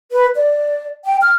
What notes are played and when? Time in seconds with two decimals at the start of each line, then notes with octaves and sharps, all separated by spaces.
0.11 B4
0.35 D5
1.05 G5
1.21 F6